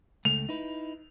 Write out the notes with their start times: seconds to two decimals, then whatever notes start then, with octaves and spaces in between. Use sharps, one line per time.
0.25 C#2 A3 F7
0.49 D#4 E4 B4